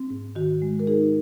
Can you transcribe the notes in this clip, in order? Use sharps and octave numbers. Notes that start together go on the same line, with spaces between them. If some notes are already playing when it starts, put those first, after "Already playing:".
Already playing: C4
G#2
D#3 F#4
G#3
A#4
D#4 G#4